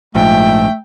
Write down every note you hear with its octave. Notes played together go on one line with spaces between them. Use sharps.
A#1 G#2 F3 A3 G5